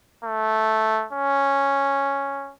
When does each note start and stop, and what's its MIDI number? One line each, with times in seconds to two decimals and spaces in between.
0.24 1.06 57
1.13 2.52 61